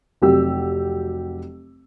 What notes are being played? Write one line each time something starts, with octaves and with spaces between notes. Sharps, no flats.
F1 F#3 G4 E6